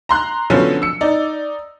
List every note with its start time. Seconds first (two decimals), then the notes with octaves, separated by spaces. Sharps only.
0.09 A#5 C6 F#6
0.50 D3 F3 F#3 B3 C#4
0.82 E6 C#7
1.01 D#4 D5